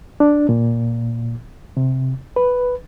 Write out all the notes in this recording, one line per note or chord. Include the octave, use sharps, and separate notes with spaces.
D4
A#2
C3
B4